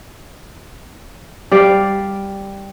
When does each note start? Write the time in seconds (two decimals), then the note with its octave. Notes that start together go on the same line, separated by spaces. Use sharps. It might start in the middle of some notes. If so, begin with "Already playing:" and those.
1.51 G3 D5 F5